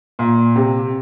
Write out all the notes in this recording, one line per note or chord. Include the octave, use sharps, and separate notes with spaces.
A#2
C3